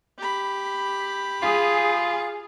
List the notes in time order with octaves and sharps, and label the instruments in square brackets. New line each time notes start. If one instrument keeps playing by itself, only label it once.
[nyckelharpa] G4 B5
[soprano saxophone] F4 [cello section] G#4